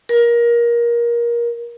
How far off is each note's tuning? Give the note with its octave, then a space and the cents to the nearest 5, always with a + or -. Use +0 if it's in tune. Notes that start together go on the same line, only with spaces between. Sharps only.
A#4 +20